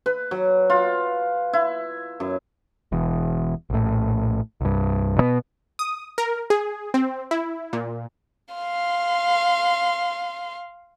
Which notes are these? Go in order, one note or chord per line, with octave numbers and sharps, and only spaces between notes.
B4
F#3
F4
E4
F#2
E1 E2
A#1 A2
C2 G2
B2 D3 B3
D#6
A#4
G#4
C4
E4
A#2
F5 C6